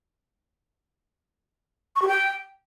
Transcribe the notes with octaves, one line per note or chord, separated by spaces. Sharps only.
C#6
G4
G5